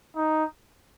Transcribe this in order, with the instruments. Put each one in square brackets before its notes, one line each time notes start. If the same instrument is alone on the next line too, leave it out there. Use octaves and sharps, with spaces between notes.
[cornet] D#4